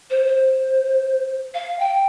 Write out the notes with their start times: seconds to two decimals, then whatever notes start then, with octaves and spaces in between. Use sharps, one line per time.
0.10 C5
0.27 C5
1.54 F5
1.79 G5